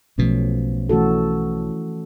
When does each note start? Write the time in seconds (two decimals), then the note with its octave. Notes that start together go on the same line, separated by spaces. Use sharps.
0.18 B1 B2 F3 A3 C#4
0.89 E3 A3 C#4 F#4 A4